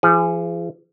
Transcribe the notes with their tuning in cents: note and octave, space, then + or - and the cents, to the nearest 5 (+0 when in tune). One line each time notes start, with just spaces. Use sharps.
F3 -40 G#4 +0